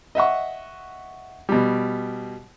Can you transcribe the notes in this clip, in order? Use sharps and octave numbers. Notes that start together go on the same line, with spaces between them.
D#5 E5 F#5 C#6
B2 G3